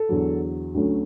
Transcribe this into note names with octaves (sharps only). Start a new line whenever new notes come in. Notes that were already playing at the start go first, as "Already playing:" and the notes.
Already playing: A4
E2 D3 F#3
D2 D3 F#3 A3 C#4